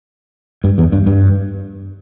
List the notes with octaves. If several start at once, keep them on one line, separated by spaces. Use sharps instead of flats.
G2
E2
G2
G2